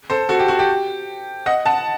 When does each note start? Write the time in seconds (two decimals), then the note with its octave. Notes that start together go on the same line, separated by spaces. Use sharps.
0.10 A4 C5
0.29 F#4 A4
0.39 G4
0.48 F#4
0.59 G4
1.46 D#5 F#5
1.66 F#5 A5